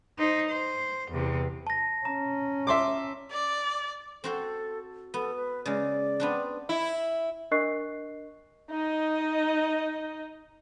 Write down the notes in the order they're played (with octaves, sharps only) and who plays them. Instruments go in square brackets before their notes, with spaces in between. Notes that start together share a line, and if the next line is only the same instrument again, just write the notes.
[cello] D#4 C5
C5
E2 C3
[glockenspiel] A5 A#6
[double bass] C#4 [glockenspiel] A#5
[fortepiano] E5 C6 D6
[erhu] D5
[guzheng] C4 F#4 C5 [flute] A4
[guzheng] B3 [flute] A4
[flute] B4
[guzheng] C#3 G#3 [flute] D5
[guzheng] B3 C4 D4
[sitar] E4
[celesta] D4 A#4 D#5 C#6 F#6 C7
[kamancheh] D#4 D#5